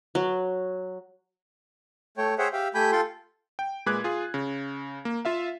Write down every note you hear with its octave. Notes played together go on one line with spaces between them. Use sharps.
F#3
A3 C#5 G5
G#4 C5 C#5 E5 F#5 G5
G4 E5 F5 G5
A3 G4 G5 G#5 B5 G6
F4 A4 G5 C6
G5
A#2 G#3 B4 D6 F#6 G#6
F4 G#4
C#3
A#3
F4 E5 F5